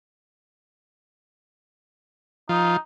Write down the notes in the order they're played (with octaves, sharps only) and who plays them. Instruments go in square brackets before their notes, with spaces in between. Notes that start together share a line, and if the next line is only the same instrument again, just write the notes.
[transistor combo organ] F3 [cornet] D#4